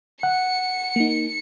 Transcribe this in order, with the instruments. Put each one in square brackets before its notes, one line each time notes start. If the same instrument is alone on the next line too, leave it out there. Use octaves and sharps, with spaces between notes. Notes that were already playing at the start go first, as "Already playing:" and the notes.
[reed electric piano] F#5 [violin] C#7
[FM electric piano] A#3 D#4